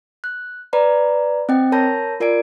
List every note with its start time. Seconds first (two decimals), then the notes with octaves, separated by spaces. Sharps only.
0.24 F#6
0.73 B4 D5 A#5 B5
1.49 C4 D#5 G5
1.72 A#4 C#5 A5 B5 G6 A#6
2.20 F4 A#4 D5 G#5 D7